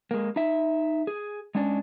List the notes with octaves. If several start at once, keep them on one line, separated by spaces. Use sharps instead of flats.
G#3 A#3
D#4 E5
G#4
G#3 C#4 D4